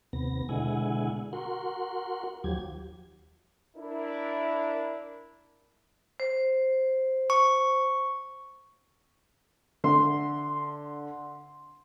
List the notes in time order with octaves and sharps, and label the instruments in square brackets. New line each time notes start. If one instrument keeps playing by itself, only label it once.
[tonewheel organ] D#2 C3 B3 A#6
B2 D3 G#3 E4 F#5 G#5
F#4 A#4 F#5 C6
D#2 F3 F#3 G4 G#6
[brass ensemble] D4 E4 A#4
[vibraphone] C5
[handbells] C#6
[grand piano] D3 [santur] C6